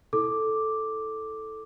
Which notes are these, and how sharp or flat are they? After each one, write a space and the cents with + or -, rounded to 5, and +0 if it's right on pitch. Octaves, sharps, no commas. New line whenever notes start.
E4 -25 A4 -5 D6 +0